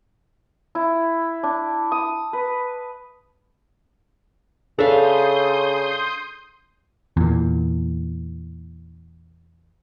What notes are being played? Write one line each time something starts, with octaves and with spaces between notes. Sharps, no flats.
E4
D4
D#6
B4
C#3 D4 A4 E5 F5 C6 D#6 G6
E2 A#2